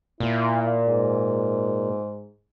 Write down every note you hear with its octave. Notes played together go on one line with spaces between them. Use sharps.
A#2 E4
G#2